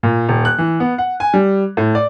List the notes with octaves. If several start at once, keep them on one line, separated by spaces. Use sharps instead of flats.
A#2
D#1
F#6
E3
B3
F#5
G#5
G3
A2
D5